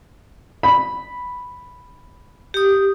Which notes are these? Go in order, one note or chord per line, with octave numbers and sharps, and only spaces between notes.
B5
G4 D#6